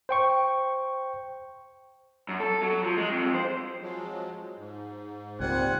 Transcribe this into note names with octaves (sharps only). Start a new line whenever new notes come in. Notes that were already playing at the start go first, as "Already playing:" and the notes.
C5 G5 C#6
F#2
A4
F#3
F3
G#3
F2
C5
F3 F#3 G#3
G#2
C#2 A#2 G3 C4 F4 F#5 G#5